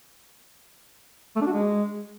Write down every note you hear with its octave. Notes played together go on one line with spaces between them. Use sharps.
A3
D4
F#4
G#3